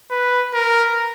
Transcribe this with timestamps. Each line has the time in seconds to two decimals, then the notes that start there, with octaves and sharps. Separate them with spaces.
0.10 B4
0.54 A#4